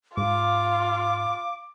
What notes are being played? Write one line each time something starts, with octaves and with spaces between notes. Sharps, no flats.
G#2 F4 F5 D6